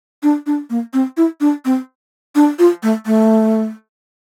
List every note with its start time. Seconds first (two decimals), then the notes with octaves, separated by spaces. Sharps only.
0.23 D4
0.46 D4
0.70 A#3
0.93 C4
1.17 E4
1.41 D4
1.65 C4
2.35 D4
2.59 F4
2.83 A3
3.06 A3